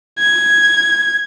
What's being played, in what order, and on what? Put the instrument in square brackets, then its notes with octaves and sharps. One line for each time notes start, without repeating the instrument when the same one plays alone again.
[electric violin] G#6